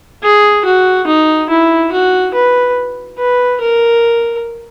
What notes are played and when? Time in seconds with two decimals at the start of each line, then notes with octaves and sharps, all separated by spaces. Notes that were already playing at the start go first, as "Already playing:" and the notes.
0.23 G#4
0.65 F#4
1.07 D#4
1.49 E4
1.92 F#4
2.34 B4
3.18 B4
3.61 A#4